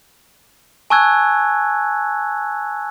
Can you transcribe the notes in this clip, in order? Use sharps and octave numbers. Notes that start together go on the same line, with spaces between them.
G#5 A5 C#6 E6 F#6 G#6